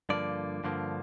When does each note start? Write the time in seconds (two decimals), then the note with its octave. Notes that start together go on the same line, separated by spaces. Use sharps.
0.09 G2 D3 F3 A#3 D5
0.64 G2 D3 F3 A#3